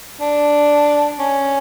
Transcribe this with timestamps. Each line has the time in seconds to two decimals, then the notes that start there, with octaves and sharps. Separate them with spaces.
0.21 D4
1.19 C#4